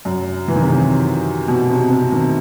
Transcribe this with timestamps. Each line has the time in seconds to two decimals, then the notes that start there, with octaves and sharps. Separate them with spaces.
0.05 F#2
0.48 E3
0.55 D#3
0.62 C3
1.48 B2
1.70 C3
1.90 C3
2.12 D#3